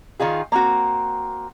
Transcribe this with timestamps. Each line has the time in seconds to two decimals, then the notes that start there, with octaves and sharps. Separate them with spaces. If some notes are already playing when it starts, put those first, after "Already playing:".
0.20 D#3 D#4 F4 G#4
0.52 A#3 C4 F#4